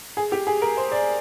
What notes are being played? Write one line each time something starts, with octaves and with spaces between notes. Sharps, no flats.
G#4
G4
G#4
A#4
C5
D5